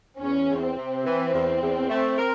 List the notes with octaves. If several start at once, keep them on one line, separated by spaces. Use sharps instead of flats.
E2 C#4
E2
C4
C3
E3
E2
E2
A3
A#4